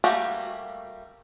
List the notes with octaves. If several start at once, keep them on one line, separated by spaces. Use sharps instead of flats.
G3 A3 A#3 F#4 G4